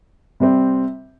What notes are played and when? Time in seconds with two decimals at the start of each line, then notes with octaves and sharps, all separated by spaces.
0.40 C3 G3 C4